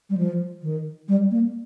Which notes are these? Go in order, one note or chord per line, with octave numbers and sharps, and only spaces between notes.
G3
F3
D#3
G3
A#3